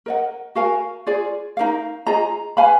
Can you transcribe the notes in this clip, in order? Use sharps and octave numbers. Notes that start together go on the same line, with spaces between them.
A#4 D#5 F#5
F#4 A#4 F5 G#5
F4 G#4 D5
D#4 A#4 F5
F4 G#4 D#5 A#5
B4 F5 G#5 B5